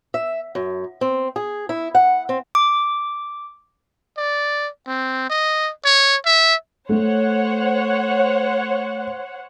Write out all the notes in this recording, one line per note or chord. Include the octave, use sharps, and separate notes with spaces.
E5
F#2
C4
G#4
E4
F#5
C4
D6
D5
C4
D#5
C#5
E5
A3 C5 C#5 F#5